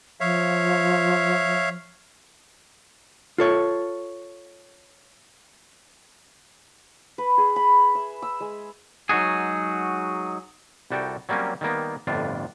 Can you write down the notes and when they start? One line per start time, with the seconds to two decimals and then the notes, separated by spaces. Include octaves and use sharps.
0.20 F3 C#5 E5 F5
3.38 F4 A4 C#5
7.18 B4
7.38 G#4
7.56 B5
7.95 E5
8.22 E6
8.40 G#3
9.09 F#3 G#3 D#4 F#4 G#4
10.91 C2 G3 F#4 A4 G5
11.29 F#3 G3 A#3 C4 C#4
11.61 D#3 G3 A#3 B3
12.07 G1 F2 A2 D4 F4